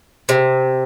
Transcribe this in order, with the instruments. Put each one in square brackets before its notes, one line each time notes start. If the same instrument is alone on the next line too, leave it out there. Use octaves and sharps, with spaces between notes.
[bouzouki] C3